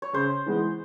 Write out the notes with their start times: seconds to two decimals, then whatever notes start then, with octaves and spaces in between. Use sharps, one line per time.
0.02 C#5
0.13 C#3 C5
0.46 E3 G#3 B3